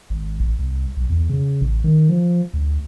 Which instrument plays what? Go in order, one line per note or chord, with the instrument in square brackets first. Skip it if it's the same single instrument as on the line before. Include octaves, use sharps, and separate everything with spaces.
[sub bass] G#1
A1
C2
B1
E2
C#3
A1
D#3
F3
D2